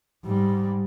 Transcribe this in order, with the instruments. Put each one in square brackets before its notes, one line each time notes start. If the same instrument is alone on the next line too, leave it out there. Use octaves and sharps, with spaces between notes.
[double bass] G#2 G3